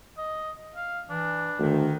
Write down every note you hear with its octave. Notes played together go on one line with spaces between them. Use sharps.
D#5
F5
E3 D4
D2 D#3